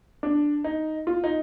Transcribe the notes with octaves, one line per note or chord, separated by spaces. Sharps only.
D4
D#4
F4
D#4